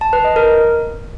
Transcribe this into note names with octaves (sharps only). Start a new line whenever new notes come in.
A5
B4
D#5
A#4